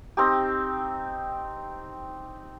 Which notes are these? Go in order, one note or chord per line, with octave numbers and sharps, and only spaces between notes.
C4 D#4 G4